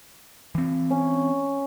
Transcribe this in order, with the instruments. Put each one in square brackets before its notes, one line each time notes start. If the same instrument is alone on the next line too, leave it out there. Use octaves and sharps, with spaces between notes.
[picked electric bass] E3 C4
[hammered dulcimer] C#4